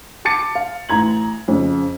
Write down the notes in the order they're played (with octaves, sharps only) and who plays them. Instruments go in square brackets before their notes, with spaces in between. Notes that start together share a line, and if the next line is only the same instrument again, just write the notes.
[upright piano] A5 D6 A6 C#7
F5
A1 A#5 G#6 F#7
F2 C#3